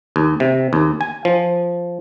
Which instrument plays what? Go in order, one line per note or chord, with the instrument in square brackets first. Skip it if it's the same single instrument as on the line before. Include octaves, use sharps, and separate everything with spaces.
[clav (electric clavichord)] D#2
C3
D#2
G#5
F3